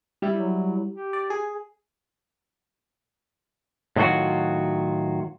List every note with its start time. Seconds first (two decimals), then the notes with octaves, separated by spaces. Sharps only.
0.22 G3 E4
0.37 F#3
0.93 G4
1.13 D5
1.30 G#4
3.96 A2 D#3 F#3 F4 F#4